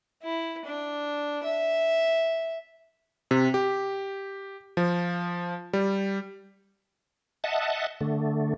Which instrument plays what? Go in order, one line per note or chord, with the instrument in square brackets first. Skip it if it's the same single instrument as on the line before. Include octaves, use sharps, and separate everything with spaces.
[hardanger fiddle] E4
D4
E5
[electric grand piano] C3
G4
F3
G3
[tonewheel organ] D#5 E5 F#5 A5
D3 A3